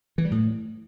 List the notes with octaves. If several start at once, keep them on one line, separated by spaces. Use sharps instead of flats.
E3
G3
A2